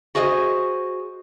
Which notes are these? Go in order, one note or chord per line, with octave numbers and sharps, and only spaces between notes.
F#4 G#4 C5 D#5